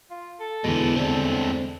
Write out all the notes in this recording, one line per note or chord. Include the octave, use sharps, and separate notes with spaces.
F4
A4
E2 B2 D3 E3 G#3
C4 D4 A4